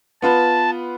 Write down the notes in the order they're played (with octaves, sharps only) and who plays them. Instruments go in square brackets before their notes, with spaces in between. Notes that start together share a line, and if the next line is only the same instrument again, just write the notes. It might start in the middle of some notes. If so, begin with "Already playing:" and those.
[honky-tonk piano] B3 F4 B4 [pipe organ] A5